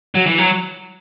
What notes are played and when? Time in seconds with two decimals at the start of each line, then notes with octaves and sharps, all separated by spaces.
0.14 F#3
0.26 E3
0.38 F#3